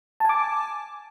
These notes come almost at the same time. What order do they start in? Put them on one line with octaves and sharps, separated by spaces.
A5 G#5 D6